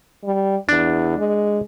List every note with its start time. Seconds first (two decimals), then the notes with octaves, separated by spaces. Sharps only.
0.24 G3
0.69 E2 D4
1.18 G#3